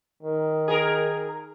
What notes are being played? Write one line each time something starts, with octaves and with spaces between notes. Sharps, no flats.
D#3
G#4 A#4